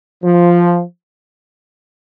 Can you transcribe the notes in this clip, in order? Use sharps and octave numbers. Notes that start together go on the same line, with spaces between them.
F3